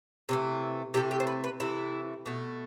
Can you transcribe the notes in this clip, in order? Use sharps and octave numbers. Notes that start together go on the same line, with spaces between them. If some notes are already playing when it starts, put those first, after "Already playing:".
C3 E3 A3
C3 E3 A3 G4
G4
C5
B4
B4
C3 E3 A3 E4
B2 A3